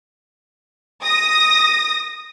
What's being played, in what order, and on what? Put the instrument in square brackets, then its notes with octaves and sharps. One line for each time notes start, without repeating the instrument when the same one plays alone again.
[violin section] D#6 A#6